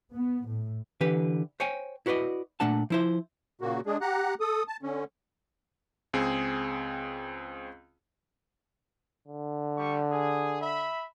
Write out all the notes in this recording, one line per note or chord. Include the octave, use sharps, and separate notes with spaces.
B3
A2
D3 E3 G4 B4
C5 C#5 G5 G#5
E4 F#4 B4 D5 D#5
A#2 A3 D4 F#5 A5
F3 E4 C5
A#2 C#3 A#3 F#4
G#3 D4 G#4
G4 F#5 A#5 F#6
A4 D#6
A5
D3 C#4
C#2 C4 G#4
D3
G3 C#6
G#4
E5 B5